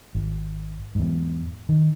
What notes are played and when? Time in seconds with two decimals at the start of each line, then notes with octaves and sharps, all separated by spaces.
0.15 G#1
0.95 E2 G#2
1.69 D#3